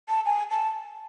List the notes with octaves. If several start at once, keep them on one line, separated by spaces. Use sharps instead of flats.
A5
G#5
A5